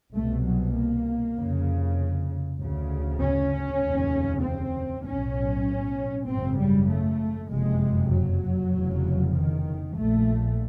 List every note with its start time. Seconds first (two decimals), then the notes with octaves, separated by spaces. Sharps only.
0.13 C2 B2 A3
0.44 F#3
0.75 A#3
1.36 F1 F2 C#3
2.59 D2 C#3
3.20 C#4
3.82 F1 D#2 C#3
4.43 C4
5.05 B1 A2 C#4
6.27 G#1 F#2 C#3 C4
6.58 G3
6.89 A3
7.50 F#1 F2 C3 G#3
8.12 F#3
8.73 F1 E2 C#3
9.34 D#3
9.96 A#1 A#2 A3